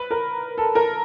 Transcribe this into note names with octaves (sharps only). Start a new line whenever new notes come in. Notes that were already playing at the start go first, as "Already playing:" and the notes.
Already playing: B4
A#4
A4
A#4